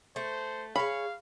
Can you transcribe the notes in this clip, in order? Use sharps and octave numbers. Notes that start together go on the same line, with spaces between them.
A3 C5
G#4 C#5 F5 B5